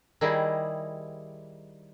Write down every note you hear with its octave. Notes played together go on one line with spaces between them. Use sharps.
D#3 G3 D#4 E4 G#4 C5